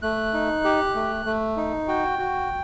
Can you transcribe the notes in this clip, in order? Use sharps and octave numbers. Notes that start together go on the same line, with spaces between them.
A3 F#6
D#4
G4
A3
A3
D#4
F#4 G5
F#4